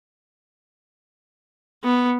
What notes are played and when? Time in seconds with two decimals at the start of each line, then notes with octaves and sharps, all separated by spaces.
1.84 B3